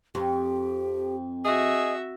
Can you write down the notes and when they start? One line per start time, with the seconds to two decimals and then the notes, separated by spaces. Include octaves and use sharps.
0.15 F2 G4
1.45 F#4 G#4 D#5 E5